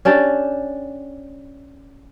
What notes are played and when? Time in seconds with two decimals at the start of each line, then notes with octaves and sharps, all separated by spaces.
0.05 C#4 D4 G4 D5